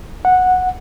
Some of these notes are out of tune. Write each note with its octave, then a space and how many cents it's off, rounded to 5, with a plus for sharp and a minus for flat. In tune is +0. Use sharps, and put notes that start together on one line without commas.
F#5 -10